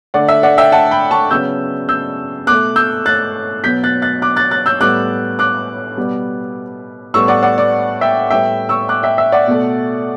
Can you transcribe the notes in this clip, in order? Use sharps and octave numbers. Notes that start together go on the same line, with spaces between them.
D3 A3 D5 F#5
E5
D5 F#5
E5 G5
F#5 A5
G5 B5
A5 C#6
C#3 F#3 B3 E6 G6
E6 G6
B2 A3 D6 F#6
E6 G6
F#6 A6
B2 F#3 B3 G6 B6
F#6 A6
F#6 A6
D6 F#6
F#6 A6
F#6 A6
E6 G6
A2 G3 B3 D6 F#6
D6 F#6
B2 G3 B3
A2 G3 B3 C#6 E6
D5 F#5
D5 F#5
D5
E5 G5
A2 G3 B3 E5 G5
C#6 E6
D6 F#6
E5 G5
E5
D5 F#5
B2 A3